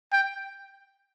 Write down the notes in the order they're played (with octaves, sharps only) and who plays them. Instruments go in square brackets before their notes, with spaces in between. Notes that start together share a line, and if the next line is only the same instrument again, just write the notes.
[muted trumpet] G5